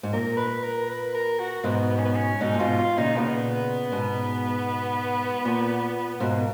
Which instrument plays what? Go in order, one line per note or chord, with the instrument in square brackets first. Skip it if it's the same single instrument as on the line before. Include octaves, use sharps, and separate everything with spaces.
[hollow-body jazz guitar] G#2
[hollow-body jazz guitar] A#2 [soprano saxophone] A#4
[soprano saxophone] B4
A#4
B4
A#4
F#4
[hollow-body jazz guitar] G#2 B2 [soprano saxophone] B3
[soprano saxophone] B3
C#4
B3
C#4
[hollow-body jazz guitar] G#2 B2 [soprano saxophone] D#4
[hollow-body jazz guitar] A#2
[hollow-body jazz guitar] G#2 B2 [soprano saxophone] F4
[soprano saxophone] F4
[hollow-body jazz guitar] A#2 C#3 [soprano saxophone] D#4
[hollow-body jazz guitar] A#2 C#3 [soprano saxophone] B3
[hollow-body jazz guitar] G#2 B2
A#2
[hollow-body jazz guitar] G#2 B2 [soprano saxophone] A#3